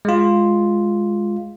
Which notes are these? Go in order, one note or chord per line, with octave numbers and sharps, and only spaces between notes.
G#3 F4